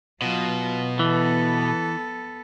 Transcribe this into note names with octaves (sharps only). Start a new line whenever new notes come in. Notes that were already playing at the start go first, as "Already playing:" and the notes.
B2 F#3 F4
E3 B3 A4